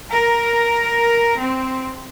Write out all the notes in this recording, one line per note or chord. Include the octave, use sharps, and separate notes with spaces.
A#4
C4